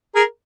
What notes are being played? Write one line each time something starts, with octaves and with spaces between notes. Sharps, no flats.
G#4 A#4